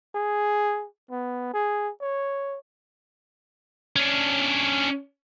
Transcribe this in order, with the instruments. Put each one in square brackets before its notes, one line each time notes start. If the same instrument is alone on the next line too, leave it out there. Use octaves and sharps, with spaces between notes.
[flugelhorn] G#4
B3
G#4
C#5
[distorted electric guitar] C#4 D4